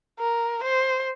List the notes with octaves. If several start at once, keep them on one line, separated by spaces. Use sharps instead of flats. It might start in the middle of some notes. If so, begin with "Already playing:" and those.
A#4
C5